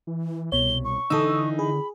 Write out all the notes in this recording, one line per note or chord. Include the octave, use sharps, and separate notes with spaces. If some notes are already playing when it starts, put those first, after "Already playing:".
E3
C2 B2 C#5 G7
C#6
D3 E3 D#4 A4 D#6 E6
G#4 B5